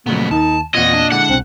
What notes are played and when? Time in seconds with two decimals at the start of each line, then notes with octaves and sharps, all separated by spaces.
0.06 F2 A#2 C#3 F#3 A3 B3
0.31 D#2 D#3 D#4 A5
0.75 E2 A#2 C4 F4 D#5 F#5 G#6
0.93 D4
1.12 D3 G#3 E4 F#5
1.29 C2 B2 C4 F#6